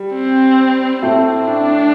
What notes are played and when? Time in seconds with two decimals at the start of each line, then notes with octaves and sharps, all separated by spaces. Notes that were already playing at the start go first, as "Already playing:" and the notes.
Already playing: G3
0.13 C4
1.03 A2 A3 C4
1.48 D4